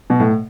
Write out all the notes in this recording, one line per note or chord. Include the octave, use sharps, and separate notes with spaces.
B2
A2